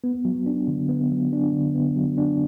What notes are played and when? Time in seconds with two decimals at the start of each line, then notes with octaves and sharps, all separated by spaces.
0.04 B3
0.25 F#3
0.46 D4
0.68 D3
0.89 B3
1.11 F#3
1.33 D4
1.53 D3
1.75 B3
1.96 F#3
2.18 D4